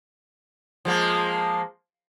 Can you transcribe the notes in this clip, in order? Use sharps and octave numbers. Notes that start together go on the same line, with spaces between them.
F3 G#3 A#3